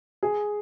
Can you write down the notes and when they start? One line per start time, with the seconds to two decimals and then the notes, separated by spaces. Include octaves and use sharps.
0.23 G#4